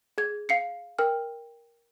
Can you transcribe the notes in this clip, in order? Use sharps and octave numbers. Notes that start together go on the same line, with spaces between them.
G#4 G#6
F5 C7 C#7
A#4 G5 F6